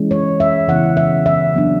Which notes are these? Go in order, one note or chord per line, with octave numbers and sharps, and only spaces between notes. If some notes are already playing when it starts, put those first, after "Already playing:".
Already playing: E3 G#3 C#4
C#5
E5
C#3 E3 B3 F#5
E5
E5
F#3 B3 D4